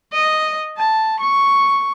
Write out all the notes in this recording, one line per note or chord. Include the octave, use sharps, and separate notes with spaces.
D#5
A5
C#6